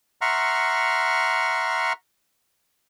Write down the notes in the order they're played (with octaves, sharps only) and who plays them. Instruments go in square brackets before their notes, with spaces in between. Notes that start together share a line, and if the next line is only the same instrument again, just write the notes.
[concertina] E5 F#5 A#5 C6 C#6 F6